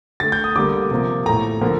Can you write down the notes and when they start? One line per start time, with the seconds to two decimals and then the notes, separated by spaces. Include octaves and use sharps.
0.20 D3 A3 A6
0.32 G6
0.44 D#6
0.56 D3 G3 A#3 D6
0.91 C3 F3 A#3
1.26 A2 A3 A#5
1.61 D3 F3 A#3